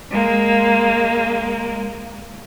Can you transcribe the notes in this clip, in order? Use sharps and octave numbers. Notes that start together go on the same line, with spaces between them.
G#3 A#3